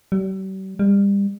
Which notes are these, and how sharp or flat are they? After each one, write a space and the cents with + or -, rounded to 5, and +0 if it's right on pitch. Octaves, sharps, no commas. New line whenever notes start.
G3 -45
G3 +30